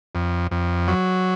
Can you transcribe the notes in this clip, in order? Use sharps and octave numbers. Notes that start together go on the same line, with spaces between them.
F2
F2
F#3